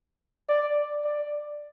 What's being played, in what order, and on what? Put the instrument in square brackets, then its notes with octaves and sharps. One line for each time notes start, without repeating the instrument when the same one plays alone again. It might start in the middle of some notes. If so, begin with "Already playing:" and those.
[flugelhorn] D5
D5